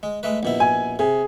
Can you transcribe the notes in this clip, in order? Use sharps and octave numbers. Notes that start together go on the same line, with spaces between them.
G#3
G#3 A3 B4
A#1 B2 E4
G#5
C3 G#4